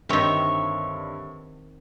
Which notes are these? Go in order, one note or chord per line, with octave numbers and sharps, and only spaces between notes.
G2 D3 D#3 C4 C#5 E5